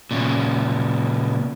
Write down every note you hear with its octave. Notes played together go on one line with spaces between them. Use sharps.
A#2 C#3